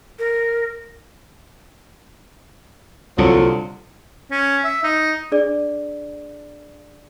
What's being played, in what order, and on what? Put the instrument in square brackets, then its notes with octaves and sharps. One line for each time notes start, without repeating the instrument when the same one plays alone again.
[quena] A#4
[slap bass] C2 A#2 [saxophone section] D3 F3 F#3
[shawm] C#4
E5
D#4
[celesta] D4 G#4 D5